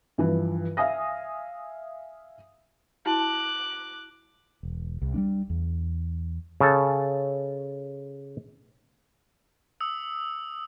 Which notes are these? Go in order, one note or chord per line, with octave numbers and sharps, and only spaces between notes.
G2 E3 F3
E5 F5 G#5 D#6 A#6
E4 F#4 A5 D6 F#6
E1
C2
G3 A#3 D4
E2
C#3 A4
D#6 E6